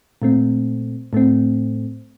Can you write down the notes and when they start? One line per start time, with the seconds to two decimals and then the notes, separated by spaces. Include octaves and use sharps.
0.22 A#2 A3 C4
1.13 A2 A3 C4